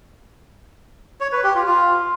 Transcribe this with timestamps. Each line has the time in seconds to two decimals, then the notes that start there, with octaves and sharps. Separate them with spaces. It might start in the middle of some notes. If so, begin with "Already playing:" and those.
1.21 C#5
1.32 B4
1.44 G4
1.55 F4
1.67 F4